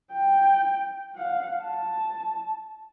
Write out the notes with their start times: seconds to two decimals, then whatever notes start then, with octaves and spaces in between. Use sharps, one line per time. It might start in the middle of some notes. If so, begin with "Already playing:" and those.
0.12 G5
1.16 F5 F#5
1.63 A5